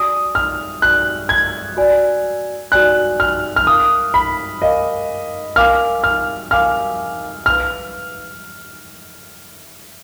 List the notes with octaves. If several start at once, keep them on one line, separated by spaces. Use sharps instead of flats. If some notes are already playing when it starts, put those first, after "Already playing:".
Already playing: F#4 D5 G#5 D#6
F6
F#4 D5 G#5 F#6
G#6
F#4 D5 G#5
F#4 D5 G#5 F#6
F6
F6
A#4 F5 G#5 D6 D#6
B5
A#4 D#5 F5 G#5 D6
A#4 F5 G#5 D6 F6
F6
A#4 F5 G#5 D6 F6
B4 F5 B5 D6 F6